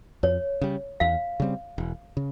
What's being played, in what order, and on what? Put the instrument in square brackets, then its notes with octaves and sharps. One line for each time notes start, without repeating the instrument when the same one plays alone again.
[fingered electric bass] F2 [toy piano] C#5
[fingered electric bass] C#3 G3
[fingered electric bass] E2 [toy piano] F5
[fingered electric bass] C#3 G3 C4
E1
C#3